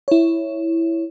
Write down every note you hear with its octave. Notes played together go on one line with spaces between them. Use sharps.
E4 C#5